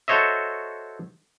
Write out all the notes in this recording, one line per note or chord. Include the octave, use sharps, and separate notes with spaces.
F#4 A4 C5 C#5 D#5 E5